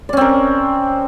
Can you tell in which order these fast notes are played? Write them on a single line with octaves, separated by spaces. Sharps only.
D5 C#4 C4 A#4